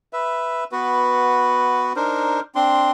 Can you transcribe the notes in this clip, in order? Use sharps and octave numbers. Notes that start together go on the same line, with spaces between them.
B4 E5
B3 F#4 B4
D4 D#4 A#4 C5
C4 D4 C6